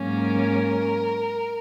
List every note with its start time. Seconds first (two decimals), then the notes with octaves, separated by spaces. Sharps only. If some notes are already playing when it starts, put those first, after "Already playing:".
Already playing: G#2 F#3 A#3 C#4
0.21 A#4